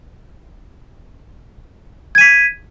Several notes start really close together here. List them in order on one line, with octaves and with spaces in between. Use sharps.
G#6 D#7 B6